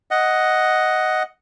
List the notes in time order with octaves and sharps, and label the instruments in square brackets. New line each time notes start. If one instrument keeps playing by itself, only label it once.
[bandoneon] D#5 F#5